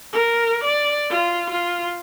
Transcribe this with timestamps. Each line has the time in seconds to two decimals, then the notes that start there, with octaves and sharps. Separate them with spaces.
0.13 A#4
0.64 D5
1.10 F4
1.50 F4